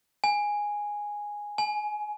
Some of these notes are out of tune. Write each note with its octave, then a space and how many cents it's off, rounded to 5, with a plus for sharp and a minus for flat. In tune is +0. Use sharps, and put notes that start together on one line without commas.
G#5 -5
G#5 +20